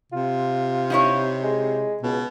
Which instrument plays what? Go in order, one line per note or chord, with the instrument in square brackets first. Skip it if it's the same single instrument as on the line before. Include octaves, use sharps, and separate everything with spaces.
[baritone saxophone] C3 [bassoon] F4
[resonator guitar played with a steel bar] D#4 E4 C#5
[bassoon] G#3
[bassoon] C#2 [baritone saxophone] B2